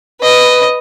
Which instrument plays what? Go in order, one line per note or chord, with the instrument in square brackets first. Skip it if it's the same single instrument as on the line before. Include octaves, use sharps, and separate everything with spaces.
[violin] B4 [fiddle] D#5